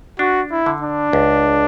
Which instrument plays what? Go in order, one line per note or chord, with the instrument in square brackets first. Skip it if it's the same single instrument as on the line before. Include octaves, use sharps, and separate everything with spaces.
[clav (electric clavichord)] D4 [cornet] F#4
[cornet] E4
[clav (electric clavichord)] D3
[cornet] D4
[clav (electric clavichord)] C#2